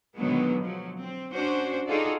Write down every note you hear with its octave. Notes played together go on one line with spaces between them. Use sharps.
B2 D3 D#3 F#3 G#3 B3
F3 F#3
C4
C#4 D4 F#4 C5
D#4 F4 F#4 G#4 A4 D5